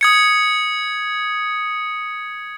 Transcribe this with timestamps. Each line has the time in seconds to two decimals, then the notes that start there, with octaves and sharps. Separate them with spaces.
0.01 D#6 G#6 C#7